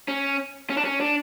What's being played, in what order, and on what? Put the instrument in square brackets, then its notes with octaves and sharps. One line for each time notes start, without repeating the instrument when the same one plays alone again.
[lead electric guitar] C#4
C#4
D4
C#4
D4